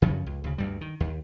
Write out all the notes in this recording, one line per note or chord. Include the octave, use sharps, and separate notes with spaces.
F#2 C#3 F3 F#3
C#2
D2 C#3
D2 G2 G3
D#3
D#2